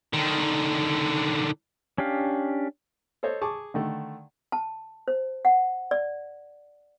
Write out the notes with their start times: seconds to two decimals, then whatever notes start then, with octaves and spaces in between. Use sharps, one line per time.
0.13 D3 D#3
1.98 C#4 D4 G4 F5
3.23 A4 C5 C#5 D#5
3.41 G#4 A5 C#6 D6
3.74 D3 D#3 A3
4.52 A5
5.08 C5
5.45 F#5
5.91 D5